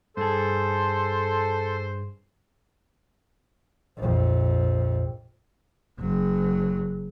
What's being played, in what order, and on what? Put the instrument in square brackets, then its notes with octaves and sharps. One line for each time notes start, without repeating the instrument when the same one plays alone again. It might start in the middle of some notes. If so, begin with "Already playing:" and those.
[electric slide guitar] G2 G#4 [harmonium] A4 [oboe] C5
[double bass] A#1 F2
F#1 F#3